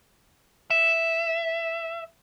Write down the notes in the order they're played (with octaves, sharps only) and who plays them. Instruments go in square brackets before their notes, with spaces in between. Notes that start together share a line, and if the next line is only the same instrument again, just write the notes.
[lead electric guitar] E5